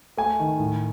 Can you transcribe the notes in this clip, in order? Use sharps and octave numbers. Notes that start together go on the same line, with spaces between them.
A3 G#5
D#3
A2